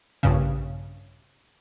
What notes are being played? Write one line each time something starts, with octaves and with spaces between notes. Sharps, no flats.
A#1 G2 C#3